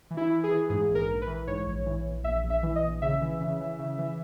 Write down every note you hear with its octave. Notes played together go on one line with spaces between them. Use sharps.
E3
E4
E3
G#4
E3
G#2 G#4
A#1
A#4
A#1
B4
E3
G#2 C#5
A#1
E3
A#1
A#1 E5
A#1
E5
E3
D#5
A#1
C#3 E5
E3
C#3
E3
C#3
E3